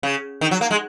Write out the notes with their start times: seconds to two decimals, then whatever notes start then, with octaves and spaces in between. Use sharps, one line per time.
0.03 C#3
0.41 D#3
0.51 F#3
0.61 A#3
0.71 G#3